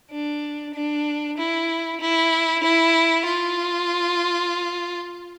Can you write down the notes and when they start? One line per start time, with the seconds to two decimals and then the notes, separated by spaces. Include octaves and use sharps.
0.11 D4
0.74 D4
1.38 E4
2.01 E4
2.64 E4
3.27 F4